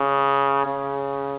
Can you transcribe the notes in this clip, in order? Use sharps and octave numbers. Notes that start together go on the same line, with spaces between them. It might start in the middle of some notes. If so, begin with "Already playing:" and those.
Already playing: C#3
C#3